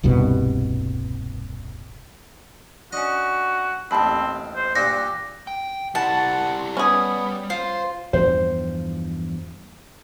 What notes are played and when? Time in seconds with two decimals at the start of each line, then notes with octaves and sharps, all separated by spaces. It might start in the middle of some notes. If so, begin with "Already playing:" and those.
0.03 D#1 C2 G2 B2
2.92 C#4 D4 F#4 D#5
3.91 A1 D#2 C4 A5 B5
4.56 C5
4.76 G2 A#2 F#4 G4 A#6
5.47 G5
5.95 G3 E4 F#5 A5
6.77 G3 B3 C#4 G#4
7.50 F4 C5
8.13 E2 G2 F3 C5